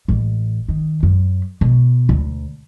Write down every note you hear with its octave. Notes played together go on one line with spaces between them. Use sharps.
A1
D#3
F#2
B2
D2